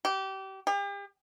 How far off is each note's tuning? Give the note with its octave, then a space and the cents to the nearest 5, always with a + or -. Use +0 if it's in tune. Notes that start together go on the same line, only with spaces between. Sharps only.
G4 -30
G4 +40